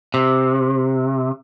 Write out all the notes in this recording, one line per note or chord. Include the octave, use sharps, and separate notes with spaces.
C3